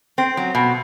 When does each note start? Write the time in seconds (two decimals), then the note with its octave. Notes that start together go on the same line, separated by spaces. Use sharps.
0.18 C4
0.37 F#3
0.55 B2